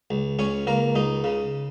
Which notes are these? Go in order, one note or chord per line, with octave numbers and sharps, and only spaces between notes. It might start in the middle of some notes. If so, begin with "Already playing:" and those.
C#2
C#2 C#4 C#5
C#2 A#3 A#4
C#2 D#4
C#3